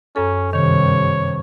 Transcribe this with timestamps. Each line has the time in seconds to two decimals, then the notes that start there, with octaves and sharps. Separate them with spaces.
0.16 F#2 C#4 A4
0.53 G2 C3 D#3 C#5